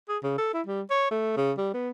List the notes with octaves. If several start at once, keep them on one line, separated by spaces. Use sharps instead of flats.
G#4
C#3
A4
E4
G3
C#5
A3
C#3
G3
B3